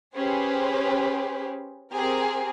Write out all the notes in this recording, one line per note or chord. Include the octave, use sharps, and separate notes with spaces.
C#4 G4 G#4 B4 C5
C4 G4 G#4 A#4